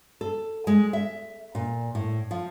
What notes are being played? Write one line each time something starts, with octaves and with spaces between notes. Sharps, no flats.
A4
G#3
E5
A#2
A2
F3